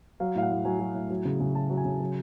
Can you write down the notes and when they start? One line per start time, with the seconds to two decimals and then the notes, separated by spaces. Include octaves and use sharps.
0.20 F#3 F5
0.35 A2 F5
0.42 F#5
0.50 A2
0.65 F#3 G#5
0.80 F#3
0.95 A2
1.10 F#3
1.25 C#3
1.40 C#3
1.55 F#3 A5
1.70 F#3
1.77 G#5
1.85 C#3
2.00 F#3